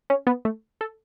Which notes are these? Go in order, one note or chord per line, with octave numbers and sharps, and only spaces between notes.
C#4
B3
A3
A4